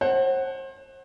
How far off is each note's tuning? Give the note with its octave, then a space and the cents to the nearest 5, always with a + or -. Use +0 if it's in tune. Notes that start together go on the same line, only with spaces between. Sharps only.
C5 +40 F#5 +15